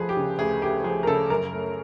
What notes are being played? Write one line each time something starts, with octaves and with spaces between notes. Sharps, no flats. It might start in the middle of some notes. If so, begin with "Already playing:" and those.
Already playing: D2 F3 A3 G#4 B4
G4
C#3
D2 G#4
A3 G4
F3 G#4
A#4
C#3 A4
F#2 A#4
A3